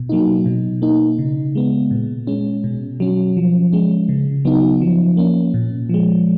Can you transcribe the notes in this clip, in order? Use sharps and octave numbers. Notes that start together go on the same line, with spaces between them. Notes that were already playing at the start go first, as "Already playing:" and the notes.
Already playing: B2
F#3 A#3 D#4
B2
A#3 D#4
C#3
G#3 B3
A#2
G#3 C#4
B2
F#3 C#4
F3
G#3 C#4
C#3
F#3 B3 D#4
F3
A#3 C#4
A#2
F3 G#3